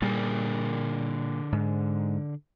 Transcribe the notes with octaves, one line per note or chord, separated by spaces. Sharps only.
A#2 D3 G3 G#4 A#4
G#2